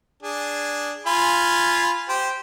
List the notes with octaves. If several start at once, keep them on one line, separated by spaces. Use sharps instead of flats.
D4 G#4
F4 G#5 B5
G4 C5